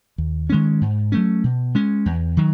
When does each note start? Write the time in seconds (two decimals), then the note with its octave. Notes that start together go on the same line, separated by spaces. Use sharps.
0.18 D#2
0.50 D#3 G#3 C#4
0.81 G#2
1.12 F#3 A3 C#4
1.44 B2
1.75 G#3 C#4
2.06 E2
2.37 D#3 F#3